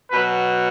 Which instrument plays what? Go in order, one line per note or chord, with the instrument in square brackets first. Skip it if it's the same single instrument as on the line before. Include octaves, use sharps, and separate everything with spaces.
[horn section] B2 F#3 B4